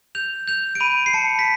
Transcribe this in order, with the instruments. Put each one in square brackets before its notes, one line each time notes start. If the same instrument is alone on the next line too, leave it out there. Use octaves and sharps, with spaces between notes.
[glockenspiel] G6 F7
G6 F7
D7
B5 D#7
C7
A5 C#7
B6